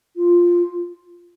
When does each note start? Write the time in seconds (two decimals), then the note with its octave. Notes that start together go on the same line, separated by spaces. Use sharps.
0.17 F4